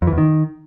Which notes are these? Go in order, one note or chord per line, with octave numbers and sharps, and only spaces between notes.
F2
E3
E2
D#3